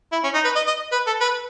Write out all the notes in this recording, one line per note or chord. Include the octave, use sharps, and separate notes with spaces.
E4
C#4
D#4
B4
D#5
D#5
B4
A4
B4